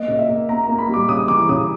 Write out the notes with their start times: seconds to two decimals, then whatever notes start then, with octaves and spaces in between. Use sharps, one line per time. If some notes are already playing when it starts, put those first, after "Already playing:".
Already playing: A#3 D#5
0.08 C#3
0.19 E5
0.29 A#3
0.49 A#3 A#5
0.63 A#3 A#5
0.78 B5
0.89 G3 D6
1.09 C#3 D#6
1.28 E3 D6
1.49 C#3 D#6